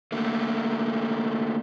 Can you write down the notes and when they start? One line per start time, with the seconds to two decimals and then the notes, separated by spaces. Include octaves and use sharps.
0.12 D3 A3 A#3